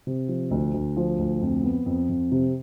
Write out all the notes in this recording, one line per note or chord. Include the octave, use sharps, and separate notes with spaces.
C3
F3
D2
D2
F3
D2
F2
B3
F2
F2
C3